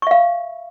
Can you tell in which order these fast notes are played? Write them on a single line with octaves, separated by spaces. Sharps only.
C#6 E5 F5